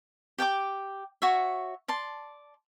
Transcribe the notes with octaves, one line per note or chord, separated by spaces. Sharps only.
G4 G5 G#5 D6
F#4 C#5 E5
D5 A5 C6